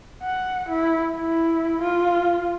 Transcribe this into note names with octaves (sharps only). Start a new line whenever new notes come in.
F#5
E4
E4
F4